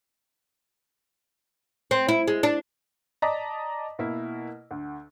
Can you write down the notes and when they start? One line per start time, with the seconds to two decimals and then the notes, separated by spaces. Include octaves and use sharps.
1.91 C4
2.08 E4
2.28 G#3
2.43 D4
3.22 D5 D#5 A5 A#5 B6
3.99 B2 A#3 E4
4.71 D2